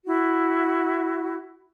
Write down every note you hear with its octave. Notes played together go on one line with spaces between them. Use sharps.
E4 F#4